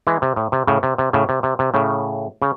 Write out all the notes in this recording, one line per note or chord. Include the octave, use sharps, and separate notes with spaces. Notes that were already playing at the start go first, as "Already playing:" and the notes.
E3 G#3
C3
A2
C3
A2 C#3
C3
C3
A2 C#3
C3
C3
C3
A2 C#3
C#3